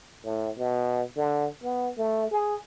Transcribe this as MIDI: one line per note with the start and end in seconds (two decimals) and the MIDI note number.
0.25 0.50 45
0.58 1.03 47
1.16 1.47 50
1.63 1.91 59
1.98 2.29 57
2.31 2.56 68